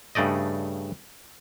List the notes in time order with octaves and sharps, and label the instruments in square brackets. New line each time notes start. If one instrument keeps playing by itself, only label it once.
[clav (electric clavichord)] G2 C#3 A3 D5 D#5